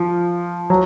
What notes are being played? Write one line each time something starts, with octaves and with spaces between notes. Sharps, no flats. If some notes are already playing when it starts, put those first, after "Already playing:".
Already playing: F3
F#3